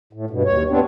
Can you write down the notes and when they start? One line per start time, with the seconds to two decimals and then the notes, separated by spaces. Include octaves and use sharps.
0.13 A2
0.30 G2 B2
0.45 D#2 C#5
0.70 G3 B3 C4 D4